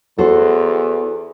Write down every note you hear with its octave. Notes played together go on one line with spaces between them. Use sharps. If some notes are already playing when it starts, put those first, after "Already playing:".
E2 F#4 A4 C5